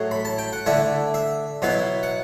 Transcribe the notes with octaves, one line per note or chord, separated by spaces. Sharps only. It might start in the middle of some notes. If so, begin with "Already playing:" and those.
Already playing: A2 F#3 A3 F#5
B5
A5
G5
F#5
D3 A3 E4 E5
E5
B2 F#3 B3 E4
F#5